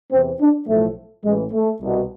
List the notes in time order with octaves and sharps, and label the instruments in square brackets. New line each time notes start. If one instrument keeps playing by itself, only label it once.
[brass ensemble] E2 C3 E3 C4
D4
B1 A2 F3 A3
A1 A2 E3 G#3
A3
C2 B2